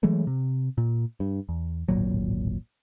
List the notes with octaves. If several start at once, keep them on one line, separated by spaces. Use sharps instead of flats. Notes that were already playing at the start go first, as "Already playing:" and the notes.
E3 F#3 G#3 A3
C3
A#2
G2
E2
D1 G#1 A#2 F#3